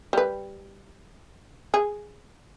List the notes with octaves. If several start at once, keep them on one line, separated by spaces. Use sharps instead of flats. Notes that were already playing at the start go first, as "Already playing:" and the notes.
G3 B4
G#4